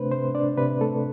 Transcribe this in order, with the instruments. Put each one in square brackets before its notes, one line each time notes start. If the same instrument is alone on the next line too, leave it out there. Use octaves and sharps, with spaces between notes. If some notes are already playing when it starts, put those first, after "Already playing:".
Already playing: [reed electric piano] C3 A3 D4 B4 C5
C3 C5
D4 D5
C3 B4
A3 A4